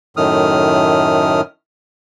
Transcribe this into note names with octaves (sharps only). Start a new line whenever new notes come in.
F#2 A2 D#3 A3 D#6 F6